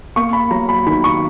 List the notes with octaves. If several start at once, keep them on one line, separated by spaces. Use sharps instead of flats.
A#3 C#6
B5
F#3 A#5
B5
D#3 B5
C#6